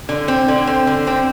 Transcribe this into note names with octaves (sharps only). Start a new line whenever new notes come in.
D3
C4
D3
C4
D3
C4